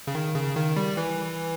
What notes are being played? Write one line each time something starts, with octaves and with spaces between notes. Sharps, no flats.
C#3
D#3
C#3
D#3
G3
E3